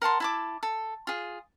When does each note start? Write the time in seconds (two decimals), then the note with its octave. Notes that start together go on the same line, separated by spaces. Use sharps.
0.02 A#4 F#5 A5 C6
0.20 E4 A5 D6
0.63 A4
1.07 F4 G#4